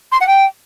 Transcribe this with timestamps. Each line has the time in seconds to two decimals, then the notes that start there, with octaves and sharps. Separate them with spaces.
0.11 C6
0.20 F#5
0.28 G5